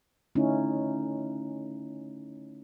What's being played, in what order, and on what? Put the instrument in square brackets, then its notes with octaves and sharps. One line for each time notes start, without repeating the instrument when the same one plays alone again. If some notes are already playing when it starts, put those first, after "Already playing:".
[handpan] D3 A3 C#4 D#4 E4